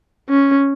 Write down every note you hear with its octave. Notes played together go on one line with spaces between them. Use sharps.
C#4